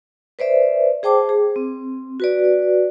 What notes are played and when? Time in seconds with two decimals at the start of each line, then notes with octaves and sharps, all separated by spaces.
0.39 B4 C5 D5 E5
1.03 G#4 C5 G5 A5 D6
1.29 G#4
1.56 C4
2.20 F#4 B4 D5